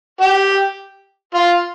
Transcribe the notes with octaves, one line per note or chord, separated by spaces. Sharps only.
G4
F4